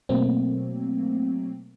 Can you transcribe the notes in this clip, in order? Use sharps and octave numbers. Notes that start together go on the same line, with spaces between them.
B2 F#3 A3 A#3 C4